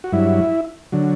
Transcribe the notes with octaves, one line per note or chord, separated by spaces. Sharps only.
F#4
G2 F#3 E4
D3 F#3